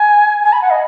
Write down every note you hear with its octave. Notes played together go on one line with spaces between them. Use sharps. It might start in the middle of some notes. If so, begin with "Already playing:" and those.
Already playing: G#5
G#5
B5
F#5
D#5